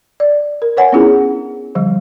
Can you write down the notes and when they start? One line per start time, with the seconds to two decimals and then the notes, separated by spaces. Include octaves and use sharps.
0.20 D5
0.62 A#4
0.77 B4 C#5 F#5 G#5
0.92 B3 C#4 D4 E4 F4 G#4
1.75 D3 F3 G3